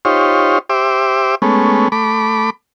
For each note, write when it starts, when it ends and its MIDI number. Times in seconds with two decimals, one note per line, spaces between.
0.05 0.58 63
0.05 0.58 65
0.05 0.58 67
0.05 0.58 72
0.05 0.58 73
0.70 1.35 67
0.70 1.35 72
0.70 1.35 76
0.70 1.35 86
1.42 1.88 56
1.42 1.88 57
1.42 1.88 59
1.42 1.88 61
1.92 2.50 57
1.92 2.50 83
1.92 2.50 86